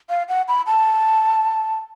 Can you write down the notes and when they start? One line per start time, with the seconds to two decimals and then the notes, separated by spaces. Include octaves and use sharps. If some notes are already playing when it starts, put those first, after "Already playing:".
0.10 F5
0.29 F#5
0.48 B5
0.67 A5